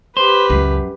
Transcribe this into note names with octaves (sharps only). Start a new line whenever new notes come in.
G4 B4 C5
C#2 F#2